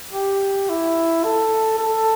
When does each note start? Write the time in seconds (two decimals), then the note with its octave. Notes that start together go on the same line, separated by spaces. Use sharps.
0.13 G4
0.69 E4
1.24 A4
1.79 A4